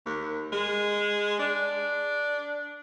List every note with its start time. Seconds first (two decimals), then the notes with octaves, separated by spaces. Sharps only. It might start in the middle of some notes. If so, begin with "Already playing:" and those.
0.06 D#2
0.53 G#3
1.39 D4